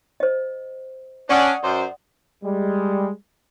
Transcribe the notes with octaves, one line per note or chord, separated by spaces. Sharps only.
C5 D#5
C#4 D4 D5 F#5 D#6
F#2 C5
G3 G#3